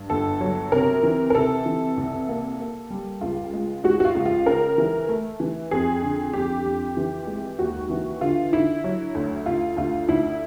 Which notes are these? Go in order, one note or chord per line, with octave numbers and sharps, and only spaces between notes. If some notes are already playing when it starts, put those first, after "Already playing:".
Already playing: G2
G1 A4
F#3
C3 A#4
E3
A#4
C3 A4
E3
C2
A#3
A#3
G3
C#2 F4
G#3
G#3 F#4
F#4
F4
C#2
F4
C#3 A#4
E3
A3
E3
F2 G#4
D3
F2 G4
F2
E3
G#3
D#2 F#4
E3
D3 F4
D3 E4
F#3
D2
D2 F4
D2 F4
D2 E4